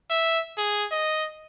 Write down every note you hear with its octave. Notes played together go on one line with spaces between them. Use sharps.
E5
G#4
D#5